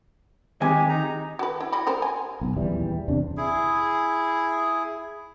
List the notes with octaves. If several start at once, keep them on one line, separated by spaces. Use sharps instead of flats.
D#3 G#3 C4 G4 G#5
D#4 A#5
F#4 B4
E4
E4 F#4 B5
G3 A#4 C5
G#5
B1
D#1 E2 E3 G3
E2 C3 D4
E4 G#4